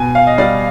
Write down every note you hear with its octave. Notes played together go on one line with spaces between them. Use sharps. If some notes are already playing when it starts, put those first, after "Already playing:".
Already playing: B2 G#5
F5
D#5
G3 D5